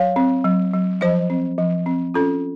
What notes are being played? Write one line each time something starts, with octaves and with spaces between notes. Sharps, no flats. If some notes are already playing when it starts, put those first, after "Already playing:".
Already playing: F#3 C#5 F5
C4
F#3
F#3
F3 C5 D#5
C4
F3
C4
C#4 F4 A4